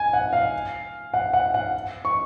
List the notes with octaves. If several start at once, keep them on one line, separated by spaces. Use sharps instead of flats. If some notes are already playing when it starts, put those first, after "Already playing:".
Already playing: G#5
F#5
F5
F#5
F#5
F#5
C#6